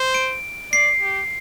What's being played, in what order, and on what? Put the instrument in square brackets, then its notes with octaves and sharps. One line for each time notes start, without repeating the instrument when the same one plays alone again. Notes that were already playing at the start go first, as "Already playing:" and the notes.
Already playing: [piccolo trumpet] C5
[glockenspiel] D7
[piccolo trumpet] D5 [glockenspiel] C7
[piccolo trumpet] G4